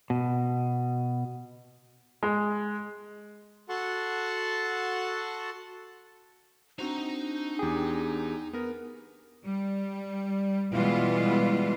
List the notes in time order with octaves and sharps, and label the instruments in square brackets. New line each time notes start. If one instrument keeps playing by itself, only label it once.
[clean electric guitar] B2
[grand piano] G#3
[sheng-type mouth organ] F#4 A4 F#5 A5 C6 C#6
[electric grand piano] C4 F#4 C5 [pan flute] D4 [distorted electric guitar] D#4 A#5
[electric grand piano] E2 G5 [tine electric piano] G4 G#4
[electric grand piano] B3 A#4
[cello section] G3
B2 E3 G3 G#3 B3 F4